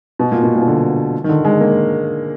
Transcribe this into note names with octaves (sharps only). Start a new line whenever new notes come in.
B2
A#2
B2
A#2
B2
D3
D#3
D3
G#3
A#3